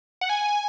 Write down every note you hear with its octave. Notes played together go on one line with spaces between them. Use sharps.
F#5
G#5